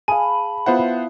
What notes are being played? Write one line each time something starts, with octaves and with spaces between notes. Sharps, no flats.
G#4 F5 G#5 A5 B5 D#7
B3 E4 F4 C5 F#5